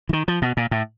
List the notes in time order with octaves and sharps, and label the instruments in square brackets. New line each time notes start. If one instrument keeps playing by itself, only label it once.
[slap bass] E3
D#3
F3
B2
A#2
A2